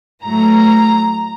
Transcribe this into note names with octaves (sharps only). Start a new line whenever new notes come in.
A2 F#3 A3 A#5